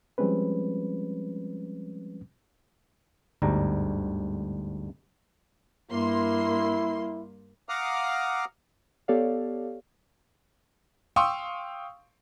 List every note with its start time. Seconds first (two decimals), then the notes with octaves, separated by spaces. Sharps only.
0.18 F3 G3 G#3 C4 C#4 B4
3.42 G1 D2 G#2 G3 A#5
5.91 G2 A#3 E4 C6
7.69 F5 F#5 A#5 D6 D#6 F6
9.08 B3 G4 A4 C#5 D5 F5
11.16 F5 G5 C6 C#6 D#6 E6